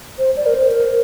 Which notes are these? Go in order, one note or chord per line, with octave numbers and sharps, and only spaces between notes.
C5
D5
A#4
C5
A#4